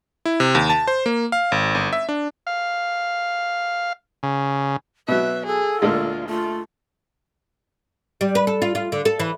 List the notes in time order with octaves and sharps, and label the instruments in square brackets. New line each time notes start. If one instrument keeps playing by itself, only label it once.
[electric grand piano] E4
C3
D#2
A5
C5
A#3
F5
G#1
G1
E5
D4
[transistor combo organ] F5
C#3
[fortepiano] B2 F#3 [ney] B4 [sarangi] E5
[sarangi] G#4 [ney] A4
[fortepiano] D2 A#2 G#3 [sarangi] F4
[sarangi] A3 [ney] F4
[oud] G3
B4
A4
F4
F4
D3
A4
E3